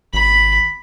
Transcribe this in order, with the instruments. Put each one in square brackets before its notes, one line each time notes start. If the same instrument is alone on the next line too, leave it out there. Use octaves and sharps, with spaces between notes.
[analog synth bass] G#1 [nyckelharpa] B5